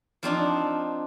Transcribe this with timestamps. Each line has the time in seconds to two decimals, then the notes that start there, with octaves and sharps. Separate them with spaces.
0.23 F3 C4 D4 D#4